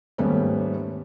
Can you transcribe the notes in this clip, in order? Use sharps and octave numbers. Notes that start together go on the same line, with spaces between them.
D#2 G#2 G3 A3 B3 C#4